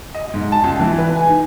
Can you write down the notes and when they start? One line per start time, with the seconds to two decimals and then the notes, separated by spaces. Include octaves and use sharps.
0.14 D#5
0.34 G#2
0.52 A5
0.64 C#2
0.80 E3
0.98 B4
1.15 G#5
1.28 D#4